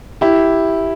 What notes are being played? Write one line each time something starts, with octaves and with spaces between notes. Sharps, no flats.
E4 G4